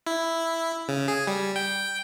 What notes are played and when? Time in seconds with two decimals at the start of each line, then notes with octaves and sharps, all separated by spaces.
0.07 E4
0.88 C#3
1.08 G#4
1.27 G3
1.56 G5